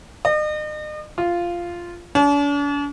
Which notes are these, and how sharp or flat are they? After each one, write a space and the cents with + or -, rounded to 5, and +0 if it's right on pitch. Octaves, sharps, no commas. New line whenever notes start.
D#5 -40
F4 -5
D4 -45